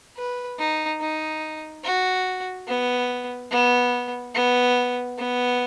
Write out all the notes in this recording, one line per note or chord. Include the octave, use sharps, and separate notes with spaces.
B4
D#4
D#4
F#4
B3
B3
B3
B3